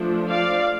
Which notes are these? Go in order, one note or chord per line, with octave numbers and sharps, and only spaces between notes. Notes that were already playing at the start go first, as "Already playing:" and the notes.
Already playing: F3 A3 D4
D5 F5